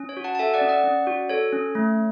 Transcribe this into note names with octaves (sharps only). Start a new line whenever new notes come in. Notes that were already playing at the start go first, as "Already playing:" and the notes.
Already playing: C#4
C#5
F#4
F#5 A5
A5
A4 E5 G#5
D5 F#5
C#4
D5 F#5
C#4
F#4
A4 C#5
C#4
A3